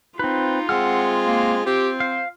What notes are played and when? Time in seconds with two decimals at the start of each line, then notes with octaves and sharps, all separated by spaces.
0.19 C4 D#4 F4 B4
0.69 G#3 C4 F#5 E6 F6
1.26 A#3
1.66 C4 G4
2.00 C5 F5